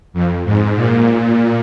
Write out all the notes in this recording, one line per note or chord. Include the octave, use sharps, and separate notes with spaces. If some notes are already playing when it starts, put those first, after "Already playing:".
F2
G#2
A#2